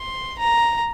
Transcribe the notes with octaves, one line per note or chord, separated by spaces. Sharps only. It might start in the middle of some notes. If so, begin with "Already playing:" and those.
Already playing: C6
A#5